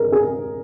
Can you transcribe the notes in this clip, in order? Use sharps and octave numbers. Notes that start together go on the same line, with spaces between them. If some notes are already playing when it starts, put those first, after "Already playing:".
Already playing: G#4 A#4
G#4